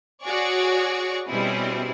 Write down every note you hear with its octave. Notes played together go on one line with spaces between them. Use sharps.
F#4 G#4 C#5 D5 C#6
B2 G3 C4 C#4 E4 G#4